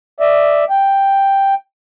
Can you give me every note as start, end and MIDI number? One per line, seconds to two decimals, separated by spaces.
0.20 0.64 74
0.20 0.64 76
0.70 1.54 79